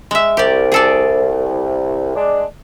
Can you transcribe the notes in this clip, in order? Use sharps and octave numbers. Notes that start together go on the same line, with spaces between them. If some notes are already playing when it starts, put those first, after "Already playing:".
G#3 E5
C2 G4 D5
G#4 A4 D5
G#3 D4